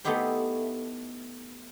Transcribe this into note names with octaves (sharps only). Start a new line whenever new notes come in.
A3 B3 D#4 E4 G4 C5